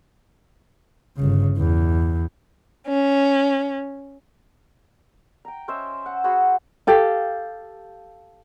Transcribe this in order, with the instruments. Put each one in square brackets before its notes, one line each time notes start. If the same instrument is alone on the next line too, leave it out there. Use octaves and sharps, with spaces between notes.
[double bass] G1 C#3
E2
[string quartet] C#4
[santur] G5 A#5
C#4 C5 D#5 E5
F#5
F#4 G#4 C5 B5
[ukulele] G4 A4 F5